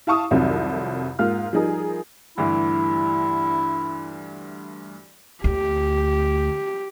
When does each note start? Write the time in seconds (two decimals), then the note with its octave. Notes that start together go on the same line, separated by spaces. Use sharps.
0.07 E4 F5 A5 C#6 D#6
0.31 C2 F2 D#3 F#3 C4
1.19 G#2 A#3 F4 F6
1.53 F3 G3 D#4 G#4 A#4
2.38 D2 G2 E3 E4
5.44 D2 G4